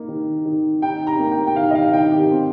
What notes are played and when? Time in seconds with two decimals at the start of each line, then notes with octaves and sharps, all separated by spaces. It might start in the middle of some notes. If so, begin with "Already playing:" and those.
Already playing: A#3 D#4
0.08 D#3
0.45 D#3
0.82 D#4 G5
1.07 A#5
1.19 A#3
1.32 G5
1.47 G5
1.56 D#3 F5
1.71 D#5
1.75 F5
1.93 D#3 G5
2.11 G4
2.31 C4